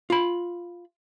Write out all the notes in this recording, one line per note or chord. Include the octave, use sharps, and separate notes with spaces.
F4 B5